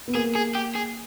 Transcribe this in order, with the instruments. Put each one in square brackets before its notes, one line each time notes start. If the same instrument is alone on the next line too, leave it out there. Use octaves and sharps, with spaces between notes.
[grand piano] B3
[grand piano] A#3 [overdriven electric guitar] G#4
[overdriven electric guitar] G#4
G4
G#4